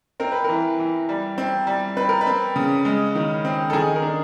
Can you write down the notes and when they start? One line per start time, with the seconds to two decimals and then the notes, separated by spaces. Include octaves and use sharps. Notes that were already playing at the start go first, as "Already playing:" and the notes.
0.20 C4 A#4
0.32 B4
0.44 E3 A#4
0.79 E3
1.09 G3
1.38 C4
1.67 G3
1.97 C4 B4
2.09 A#4
2.21 B4
2.27 C4
2.56 C#3
2.85 G#3
3.15 D#3
3.45 C4
3.70 A4
3.73 D#3 G#4
3.96 A#4
4.03 D4